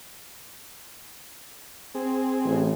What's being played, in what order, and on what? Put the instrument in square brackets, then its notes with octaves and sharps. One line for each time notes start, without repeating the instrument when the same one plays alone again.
[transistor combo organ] C4 G#4
[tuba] A1